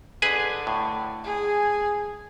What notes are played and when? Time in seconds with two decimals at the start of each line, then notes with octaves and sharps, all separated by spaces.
0.22 D3 G#4 B4 G#5
0.67 A2
1.24 G#4